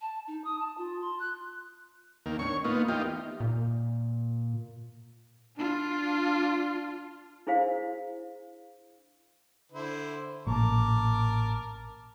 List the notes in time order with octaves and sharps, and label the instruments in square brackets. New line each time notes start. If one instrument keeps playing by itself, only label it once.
[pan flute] A5
D#4
D#6
A5
F4
C6
F#6
[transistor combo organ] D#2 A#3
[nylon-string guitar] C4 D4 [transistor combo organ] C#5 C#6
[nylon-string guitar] A#3 [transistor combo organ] B3 D#4 F4
[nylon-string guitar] E2 [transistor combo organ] D#4 F4 G4
[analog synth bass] A#2
[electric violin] D4 F4
[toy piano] D4 E4 G#4 C5 F5
[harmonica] D3 E4 C5
[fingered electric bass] A1 A#2 [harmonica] A#4 A5 D6